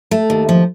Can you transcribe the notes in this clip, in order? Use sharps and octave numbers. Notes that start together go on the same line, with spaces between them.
A3
D#2
F3